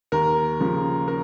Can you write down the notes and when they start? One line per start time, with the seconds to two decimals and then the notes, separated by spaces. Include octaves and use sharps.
0.12 D#2 A#4
0.60 C#3 F3
1.08 A#4